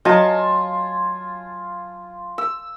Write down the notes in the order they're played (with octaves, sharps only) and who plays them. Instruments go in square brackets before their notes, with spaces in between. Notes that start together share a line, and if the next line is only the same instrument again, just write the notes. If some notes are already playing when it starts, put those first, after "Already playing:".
[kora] F#3 D#5 [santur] F4 G#5 A5
[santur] E6